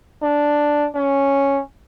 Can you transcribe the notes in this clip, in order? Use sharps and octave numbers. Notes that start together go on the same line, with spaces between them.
D4
C#4